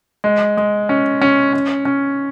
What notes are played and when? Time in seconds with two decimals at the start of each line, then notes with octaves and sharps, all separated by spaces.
0.24 G#3
0.57 G#3
0.89 C#4
1.21 C#4
1.53 C#4
1.85 C#4